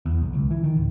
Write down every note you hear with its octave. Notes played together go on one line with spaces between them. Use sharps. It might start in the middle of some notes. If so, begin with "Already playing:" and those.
E2
B1
C#2
E3
D#3
D1